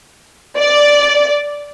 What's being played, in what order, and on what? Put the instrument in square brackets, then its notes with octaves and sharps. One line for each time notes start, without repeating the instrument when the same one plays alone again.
[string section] D5